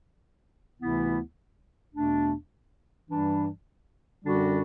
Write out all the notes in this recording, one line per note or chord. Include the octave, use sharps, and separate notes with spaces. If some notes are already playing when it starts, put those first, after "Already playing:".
D2 C3 E3 B3 E4
E2 B2 A3 D4
G2 E3 G3 D4
F#2 D3 G3 D4 F#4